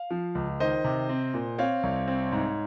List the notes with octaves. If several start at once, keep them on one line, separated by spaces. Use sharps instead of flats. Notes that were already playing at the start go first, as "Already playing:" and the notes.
Already playing: F5
F3
C#2
D#3 C5 D#5
C3
C4
A#2
C4 C#5 F5
C2
C4
G#2